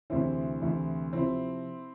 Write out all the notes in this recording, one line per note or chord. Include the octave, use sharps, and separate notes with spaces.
D2 C3 E3 C4 E4
D2 C3 E3
C3 F3 C4 E4